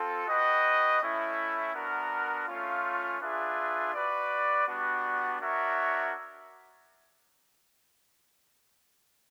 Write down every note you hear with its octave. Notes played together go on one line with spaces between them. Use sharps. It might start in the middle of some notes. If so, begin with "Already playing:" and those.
Already playing: C4 F4 A4
F#4 B4 D#5 G5
A3 C#4 E4
B3 D4 F#4 A#4
A3 C#4 F4
D4 F4 G#4 B4 E5
F#4 B4 D5
G3 B3 D4 F#4
D4 F#4 A#4 C#5 E5